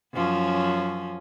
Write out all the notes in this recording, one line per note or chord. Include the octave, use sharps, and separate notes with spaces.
F#2 F3 C#4